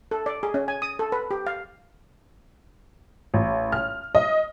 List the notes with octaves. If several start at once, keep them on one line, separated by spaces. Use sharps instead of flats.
A4
D5
G#4
C#4
G#5
D#6
A4
B4
G4
F5
A1
F6
D#5